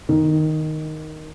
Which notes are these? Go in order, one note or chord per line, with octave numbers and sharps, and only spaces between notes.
D#3